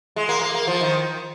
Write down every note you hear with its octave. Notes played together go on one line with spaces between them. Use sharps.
G#3
A#3
A#3
A#3
F3
D#3